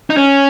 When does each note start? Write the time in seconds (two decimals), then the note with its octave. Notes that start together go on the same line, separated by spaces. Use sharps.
0.10 D#4
0.17 C#4